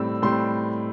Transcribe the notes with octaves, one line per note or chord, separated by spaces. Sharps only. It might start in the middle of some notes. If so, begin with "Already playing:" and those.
Already playing: A2 G3 C4 E6
A2 G3 C4 C6